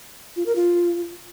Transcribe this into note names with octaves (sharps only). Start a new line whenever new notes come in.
F4
A#4
F4